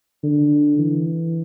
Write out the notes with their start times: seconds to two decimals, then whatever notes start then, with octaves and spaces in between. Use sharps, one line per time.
0.23 D3
0.79 E3